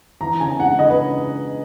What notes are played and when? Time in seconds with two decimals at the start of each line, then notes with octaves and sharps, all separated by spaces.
0.21 E3 A#5
0.40 C#3 G#5
0.60 G#3 F#5
0.79 C#3 D#5
0.90 B4